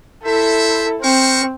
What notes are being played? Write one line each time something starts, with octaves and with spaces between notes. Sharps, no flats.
E4 A4 C5 E5
C4 A#4 C5 C#6